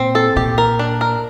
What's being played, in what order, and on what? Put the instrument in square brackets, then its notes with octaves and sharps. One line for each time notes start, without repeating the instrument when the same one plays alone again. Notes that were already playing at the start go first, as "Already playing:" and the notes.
Already playing: [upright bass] A#2 [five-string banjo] C4
[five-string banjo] A4
[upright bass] A#2 [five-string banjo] G4
[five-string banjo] A#4
D4
A#4